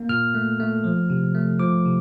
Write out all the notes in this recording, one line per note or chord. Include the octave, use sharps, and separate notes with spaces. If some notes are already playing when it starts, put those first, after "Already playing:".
Already playing: A#3
A#2 F6
A3
A3
F3
C3
A3
F3 D6
C3